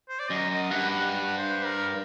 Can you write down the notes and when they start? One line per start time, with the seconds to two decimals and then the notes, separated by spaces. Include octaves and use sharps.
0.09 C5
0.19 D5
0.30 F#2 D#5
0.50 D#5
0.71 G2 F#5
0.90 F#5
1.11 F#5
1.37 C5
1.65 A#4